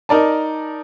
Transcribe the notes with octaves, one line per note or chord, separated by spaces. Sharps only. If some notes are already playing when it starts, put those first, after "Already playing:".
D#4 A#4 D5 A5